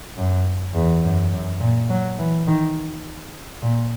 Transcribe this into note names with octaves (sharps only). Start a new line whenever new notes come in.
F#2
E2
F#2
F#2
A#2
F#3
E3
D#3
A#2